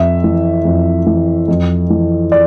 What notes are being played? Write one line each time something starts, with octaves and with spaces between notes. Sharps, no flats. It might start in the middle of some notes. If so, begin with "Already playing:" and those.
Already playing: F2 E5
E3
F2
E3
F2
E3
D5